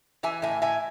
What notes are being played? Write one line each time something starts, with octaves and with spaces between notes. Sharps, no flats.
E3 E5 G#5
A2 E5 G#5
A2 E5 G#5